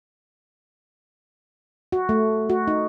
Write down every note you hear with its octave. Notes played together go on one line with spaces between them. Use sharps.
F#4
A3
F#4
D#4